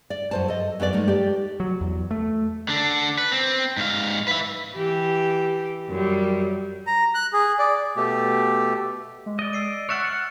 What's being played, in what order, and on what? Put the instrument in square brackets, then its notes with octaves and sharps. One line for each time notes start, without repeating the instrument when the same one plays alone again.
[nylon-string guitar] D5
F#2 C5 A5
A4 D#5
F#2 B3 A4 D5
G#3 A3 D#4 A#4
G4 D5
[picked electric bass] F#3
E2
A3
[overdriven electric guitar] D3 D4
B4
C4
G#2 F5
B4 E5
[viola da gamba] E3 G4
F#2 G3
[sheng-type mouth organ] A#5
F#6
G#4
D5
[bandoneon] B2 A3 G4
[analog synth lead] G#3
[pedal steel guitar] D5 D#5 [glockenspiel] G7
[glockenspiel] E6 C7 D7
[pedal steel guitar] C#5 E5 F#5 [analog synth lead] F6 [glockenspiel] F#6 A6 C#7
[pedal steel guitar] F#5